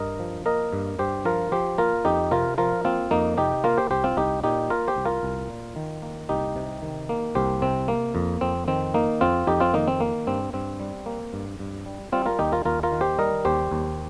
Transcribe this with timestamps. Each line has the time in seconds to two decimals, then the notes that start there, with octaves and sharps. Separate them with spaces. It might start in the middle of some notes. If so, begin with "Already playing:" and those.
Already playing: G2 A#4 D#5
0.19 F3
0.46 A#3 A#4 D#5
0.73 G2
0.99 G2 G4 C5
1.25 F3 F4 A#4
1.52 F3 G4 C5
1.78 A#3 F4 A#4
2.05 F2 D#4 G4
2.31 C3 F4 A#4
2.58 F3 F4 A#4
2.85 A#3 C4 F4
3.11 F2 A#3 D#4
3.38 C3 D#4 G4
3.64 A#3 F4 A#4
3.77 G4 C5
3.90 C2 G4 C5
4.04 C4 F4
4.17 C2 D#4 G4
4.44 A#2 D#4 G4
4.70 A#3 F4 A#4
4.88 G4 C5
4.97 C2
5.05 F4 A#4
5.23 C2
5.50 A#2
5.76 D#3
6.02 A#3
6.29 C2 D#4 G4
6.56 C3
6.82 D#3
7.09 A#3
7.35 C2 G4 C5
7.62 C3 C4
7.88 A#3
8.15 F2
8.41 F2 C4
8.68 D#3 C4
8.94 A#3 D#4
9.21 F2 C4 F4
9.47 F2 D#4 G4
9.60 C4 F4
9.74 D#3 A#3 D#4
9.88 C4
10.00 A#3
10.27 G2 C4
10.53 G2 C4
10.80 G3
11.06 A#3
11.33 G2
11.59 G2
11.86 G3
12.12 G3 C4 F4
12.26 F4 A#4
12.39 D#2 D#4 G4
12.52 F4 A#4
12.65 D#2 F4 A#4
12.83 F4 A#4
12.92 D#3
13.01 G4 C5
13.18 G3 A#4 D#5
13.45 D#2 G4 C5
13.71 D#2